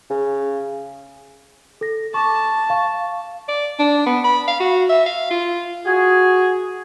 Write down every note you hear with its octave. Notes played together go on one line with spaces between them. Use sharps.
C#3
A4 A#6
A5 C#6 D6
F5 C#6
D5
D4
B3
B5
F5
F#4
E5
F5
F4
F#4 G#4